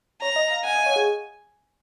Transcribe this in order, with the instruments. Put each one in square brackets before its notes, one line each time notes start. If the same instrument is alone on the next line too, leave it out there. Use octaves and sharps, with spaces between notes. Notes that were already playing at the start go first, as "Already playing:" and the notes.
[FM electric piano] C#5 [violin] A#5
[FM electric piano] D#5
F5
[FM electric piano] F#5 [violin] G#5
[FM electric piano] D#5
C#5
G#4